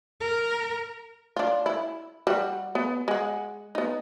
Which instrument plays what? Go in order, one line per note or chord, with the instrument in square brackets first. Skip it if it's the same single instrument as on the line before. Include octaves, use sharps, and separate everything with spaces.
[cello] A#4
[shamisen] D4 F4
E4
G3 F#4
B3
G#3 F#5
B3 D#4